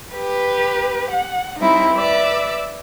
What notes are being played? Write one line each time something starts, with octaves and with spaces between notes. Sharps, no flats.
G4 B4
F#5
G3 C4 D#4 E4
B4 D5 E5 E6